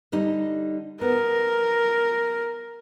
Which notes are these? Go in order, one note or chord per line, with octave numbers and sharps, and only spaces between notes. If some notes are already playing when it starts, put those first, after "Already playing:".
D3 G3 D#4
B3 A#4